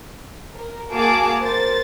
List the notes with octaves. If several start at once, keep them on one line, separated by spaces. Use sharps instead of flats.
A#4
A#3 F#4 G#4 F5 A5 D6
A#4 C5 A6